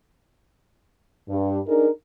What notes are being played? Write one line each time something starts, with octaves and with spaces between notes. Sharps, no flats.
G2
D4 D#4 G#4 A#4